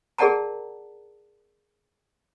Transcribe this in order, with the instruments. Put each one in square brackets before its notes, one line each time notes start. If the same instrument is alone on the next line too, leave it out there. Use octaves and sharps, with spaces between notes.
[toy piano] G#4 A#4 D5 F#5 A5 A#5